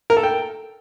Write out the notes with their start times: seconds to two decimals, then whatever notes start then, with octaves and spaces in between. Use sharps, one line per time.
0.10 A#4
0.17 A4
0.23 G5